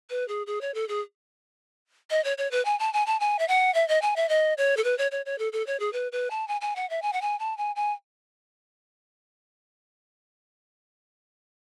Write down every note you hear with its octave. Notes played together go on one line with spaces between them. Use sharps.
B4
G#4
G#4
C#5
A4
G#4
D#5
C#5
C#5
B4
G#5
A5
G#5
A5
G#5
E5
F#5
E5
D#5
G#5
E5
D#5
C#5
A4
B4
C#5
C#5
C#5
A4
A4
C#5
G#4
B4
B4
A5
G#5
G#5
F#5
E5
G#5
F#5
G#5
A5
G#5
G#5